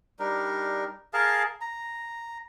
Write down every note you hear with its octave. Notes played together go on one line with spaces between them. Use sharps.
G3 D4 D#4 A#4
G#4 A#4 F5 A5
A#5